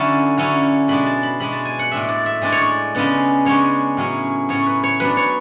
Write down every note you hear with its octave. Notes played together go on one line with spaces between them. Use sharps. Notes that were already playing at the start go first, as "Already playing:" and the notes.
Already playing: D3 F#3 C#4 E4 A5
D3 F#3 C#4 E4
B2 G#3 D4 B5
A5
B5
B2 G#3 D4 B5
A5
G#5
F#5
A2 G#3 D4 E5
D5
E5
A2 G#3 D4 D5
C#5
D5
C#3 G#3 B3 D4
C#3 G#3 B3 D4 C#5
A2 F#3 C#4
A2 F#3 C#4 C#5
B4
C#5
F#3 B3 D4 B4
C#5